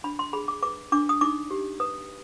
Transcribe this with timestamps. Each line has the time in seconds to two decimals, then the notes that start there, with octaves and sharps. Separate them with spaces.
0.04 D4 B5
0.19 C6
0.33 G#4 B5
0.48 D6
0.62 B4 D6
0.92 D4 D6
1.09 D#6
1.21 D#4 D6
1.51 G4
1.80 B4 D#6